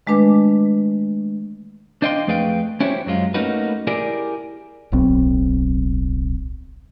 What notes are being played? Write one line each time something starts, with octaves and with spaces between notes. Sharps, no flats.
D#3 G#3 A3 D4 B4 D6
D4 C5 D#5 F5 G5 C6
F2 A3 G#4 B4 F5 G5
C#4 E4 F#4 G4 C5 C#5
F#2 F#3 G#3 F4
A3 A#3 C#4 D#4 F#4 B4
E4 G4 G#4 A#4 D5
D1 B1 C4